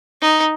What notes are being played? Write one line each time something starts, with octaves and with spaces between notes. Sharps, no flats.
D#4